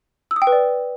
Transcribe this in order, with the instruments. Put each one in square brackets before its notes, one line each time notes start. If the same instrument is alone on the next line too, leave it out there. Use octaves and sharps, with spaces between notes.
[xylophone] E6
D#6
G5
B4
D5